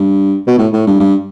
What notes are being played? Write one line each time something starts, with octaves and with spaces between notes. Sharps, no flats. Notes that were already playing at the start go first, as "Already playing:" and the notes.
Already playing: G2
B2
A2
A2
G2
G2